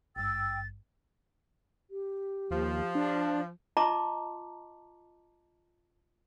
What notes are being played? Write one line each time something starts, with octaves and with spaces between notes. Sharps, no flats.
G#1 G2 G5 E6 A6
G4
D#2 F3
D4
F4 D#5 A5 A#5 C6 D6